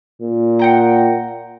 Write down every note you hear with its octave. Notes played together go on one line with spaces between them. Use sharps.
A#2
F#5 G5 A#5